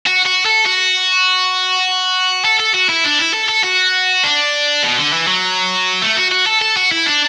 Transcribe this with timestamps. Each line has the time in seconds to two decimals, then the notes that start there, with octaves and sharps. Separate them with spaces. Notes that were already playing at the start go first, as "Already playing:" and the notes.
0.06 F#4
0.26 F#4
0.45 A4
0.66 F#4
2.45 A4
2.59 A4
2.74 F#4
2.89 E4
3.04 D4
3.19 E4
3.34 A4
3.49 A4
3.64 F#4
4.23 D4
4.83 B2
4.98 D3
5.13 E3
5.27 F#3
6.02 A3
6.17 F#4
6.32 F#4
6.47 A4
6.62 A4
6.77 F#4
6.91 E4
7.06 D4